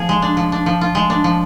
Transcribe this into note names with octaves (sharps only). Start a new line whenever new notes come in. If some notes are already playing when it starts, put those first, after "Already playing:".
Already playing: F3 G#4
G#3
D4
F3
D4
F3
F4
G#3
D4
F3